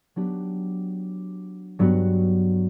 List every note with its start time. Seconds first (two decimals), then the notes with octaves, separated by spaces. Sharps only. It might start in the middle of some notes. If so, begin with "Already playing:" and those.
0.16 F#3 B3 D4 G4
1.79 G2 F#3 B3 F#4